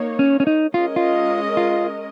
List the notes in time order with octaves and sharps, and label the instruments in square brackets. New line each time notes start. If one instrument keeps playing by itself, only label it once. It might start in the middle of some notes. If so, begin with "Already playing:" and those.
Already playing: [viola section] A#3 D#4 C#5
[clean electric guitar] C#4
C#4
D#4
[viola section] G#3 C#4 A#4 D#5 [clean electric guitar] F4
[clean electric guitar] F4
F4